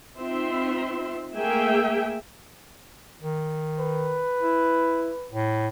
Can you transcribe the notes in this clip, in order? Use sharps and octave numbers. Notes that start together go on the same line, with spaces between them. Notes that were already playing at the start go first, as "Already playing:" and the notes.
C4 D#4 F4 E5 C6
A3 A#3 G#4 E5 G5 G#5
D#3
B4
E4
A2